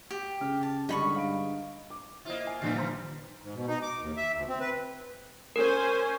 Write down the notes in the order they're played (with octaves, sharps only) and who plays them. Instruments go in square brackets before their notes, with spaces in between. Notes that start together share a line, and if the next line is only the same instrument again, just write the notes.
[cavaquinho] G4
[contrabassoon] C#3 [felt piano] F6
[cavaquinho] A5
[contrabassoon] G2 [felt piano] D3 G3 G#3 [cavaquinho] D#4 B5 C#6
[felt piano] F5 D7
[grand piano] D6
[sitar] A#3 F4 [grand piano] E4 C5 D#5
[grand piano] G#5
[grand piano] G1 A#2 C7 [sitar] D3 F3 G3
[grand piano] C5 A#5 C6
[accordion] G#2
B2
D#4
D6
D#2
E5
D2
C4
B4
[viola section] C#4 C5 G#5 [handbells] A#4